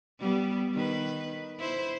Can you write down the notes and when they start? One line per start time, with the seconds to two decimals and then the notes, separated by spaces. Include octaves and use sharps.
0.20 G3 B3
0.74 D#3 B4
1.59 E4 C5